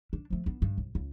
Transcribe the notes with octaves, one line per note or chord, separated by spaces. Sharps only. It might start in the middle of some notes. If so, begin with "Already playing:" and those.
D4
F3 A3
B3 D4
G2
C2
C#2